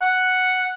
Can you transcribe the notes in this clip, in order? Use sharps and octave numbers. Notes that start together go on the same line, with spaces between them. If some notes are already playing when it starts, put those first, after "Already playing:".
F#5